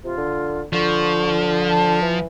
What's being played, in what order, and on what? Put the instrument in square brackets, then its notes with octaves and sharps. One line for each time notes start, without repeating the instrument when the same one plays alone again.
[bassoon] C3 [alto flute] F4
[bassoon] D3
[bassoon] D3 [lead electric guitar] F3 [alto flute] C#6
[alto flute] A5
[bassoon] E3